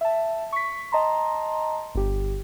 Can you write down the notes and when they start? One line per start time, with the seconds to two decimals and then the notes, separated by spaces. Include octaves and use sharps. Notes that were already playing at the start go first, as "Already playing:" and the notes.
0.01 E5 A5
0.52 C#6 B6
0.92 D#5 A5 A#5 C6
1.95 G1 G4